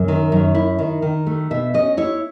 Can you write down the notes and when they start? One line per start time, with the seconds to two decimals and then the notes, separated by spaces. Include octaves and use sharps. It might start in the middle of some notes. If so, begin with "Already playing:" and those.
Already playing: F#2
0.08 D#3
0.32 F#2
0.55 E4
0.79 D#3
1.02 D#3
1.27 A3
1.51 B2 E5
1.74 C#4 D#5
1.97 E4 C#5